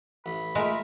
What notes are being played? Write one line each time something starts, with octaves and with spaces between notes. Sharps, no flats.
A1 B5
G#3 A3 D#4 F4 A#4 E5